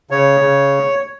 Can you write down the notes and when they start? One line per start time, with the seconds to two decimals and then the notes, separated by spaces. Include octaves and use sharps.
0.10 C#3 C#5
0.40 C#3